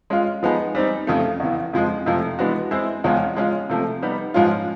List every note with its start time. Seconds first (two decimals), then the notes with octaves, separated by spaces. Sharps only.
0.10 G#3 C#4 F4
0.43 F3 G#3 B3 D#4 G#4
0.75 G3 C4 D#4
1.07 F2 C#3 F3 A3
1.40 E2 C#3 E3
1.73 F2 C#3 F3 G#3
2.06 F2 C3 F3 A3
2.39 E3 G#3 B3 D4 F#4
2.71 G#3 C4 E4 G#4 C5
3.04 E2 C#3 F3 G#3 C#4
3.37 G#3 C#4 F4
3.69 C3 F3 A3
4.03 G3 B3 D#4
4.34 G#2 F3 G#3 C#4 F4